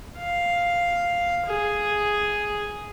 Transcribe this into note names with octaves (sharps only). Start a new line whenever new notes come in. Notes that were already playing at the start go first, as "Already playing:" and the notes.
F5
G#4